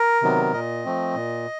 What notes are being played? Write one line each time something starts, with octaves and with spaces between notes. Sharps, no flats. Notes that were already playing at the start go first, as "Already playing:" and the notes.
Already playing: A#4
C3 D#3 F#3 B3
A#2 D#5
F3 A3 C4
A#2